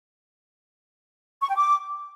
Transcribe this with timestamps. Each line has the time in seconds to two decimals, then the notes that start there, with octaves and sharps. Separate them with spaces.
1.42 C#6
1.49 G5
1.57 D6